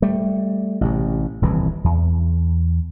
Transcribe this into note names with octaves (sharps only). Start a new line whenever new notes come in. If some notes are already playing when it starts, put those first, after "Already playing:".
G3 A3
A1 C3
D#1 C2 E3
E2